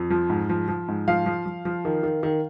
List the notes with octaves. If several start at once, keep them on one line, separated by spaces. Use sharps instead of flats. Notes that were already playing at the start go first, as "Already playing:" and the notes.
Already playing: F2
F3
G#2
F3
F3
G#2
F3 F5
F3
F3
F3
D#3
D#3
D#3